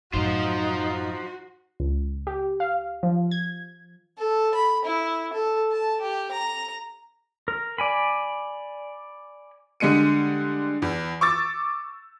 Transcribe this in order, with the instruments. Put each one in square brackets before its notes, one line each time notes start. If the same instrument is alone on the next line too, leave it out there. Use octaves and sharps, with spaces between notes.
[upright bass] F#2 A2 [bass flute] D#4 [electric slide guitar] F4 C5 [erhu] F#4
[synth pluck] C#2
G4
F5
F3
G#6
[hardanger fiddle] A4
B5
E4
A4
A5
G4
A#5
[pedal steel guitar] A#4
D5 G#5 B5
[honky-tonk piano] D3 G3 G#3 C#7 D#7
E2
C#6 D6 E6 A6